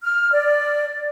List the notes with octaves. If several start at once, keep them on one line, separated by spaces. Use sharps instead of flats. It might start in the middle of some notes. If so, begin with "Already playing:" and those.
F6
D5